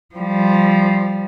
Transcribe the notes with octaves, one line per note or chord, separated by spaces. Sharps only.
F3 G3